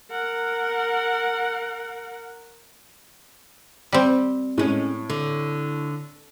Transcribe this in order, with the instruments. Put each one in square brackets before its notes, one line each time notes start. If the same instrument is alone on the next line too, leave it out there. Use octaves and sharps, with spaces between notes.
[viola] A#4 F#5
[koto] G3 C4
[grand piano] A2 [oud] G#3 C#4
[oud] D3